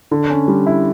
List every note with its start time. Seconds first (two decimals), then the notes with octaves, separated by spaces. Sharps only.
0.11 D3
0.30 C#4
0.48 G3
0.66 E4